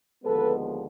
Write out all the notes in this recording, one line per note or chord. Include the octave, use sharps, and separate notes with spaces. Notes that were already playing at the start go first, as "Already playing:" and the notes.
D#2 D3 F3 G#3 B3 A4 B4